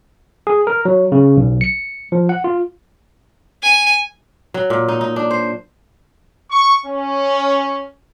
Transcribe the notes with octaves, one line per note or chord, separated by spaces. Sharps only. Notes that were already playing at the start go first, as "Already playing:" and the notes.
G#4
A#4
F#3
C#3
B1
C#7
F3
F#5
F4
G#5
F#3
A#2
D#4
D#4
D4
C5
C#6
C#4